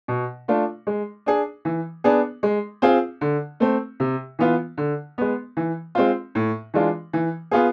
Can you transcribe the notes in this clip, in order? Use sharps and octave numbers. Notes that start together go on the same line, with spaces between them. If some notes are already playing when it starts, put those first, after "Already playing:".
B2
A3 D4 F4
G#3
D4 G#4
E3
B3 D4 G#4
G#3
C4 F4 G#4
D3
A3 C4
C3
E3 B3 F4
D3
G#3 B3
E3
G#3 C4 F4
A2
E3 G#3 D4 F4
E3
B3 F4 G#4